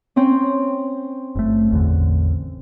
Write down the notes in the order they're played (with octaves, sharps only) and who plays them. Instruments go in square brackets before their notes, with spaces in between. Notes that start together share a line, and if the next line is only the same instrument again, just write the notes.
[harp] C4 C#4
[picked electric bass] F#1 A3
A1 E2 D3